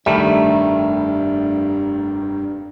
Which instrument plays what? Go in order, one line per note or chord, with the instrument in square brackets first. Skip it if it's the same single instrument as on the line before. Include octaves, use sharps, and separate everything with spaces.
[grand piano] F1 D#3 [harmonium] G2 [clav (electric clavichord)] G3 A3 [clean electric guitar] E5 B5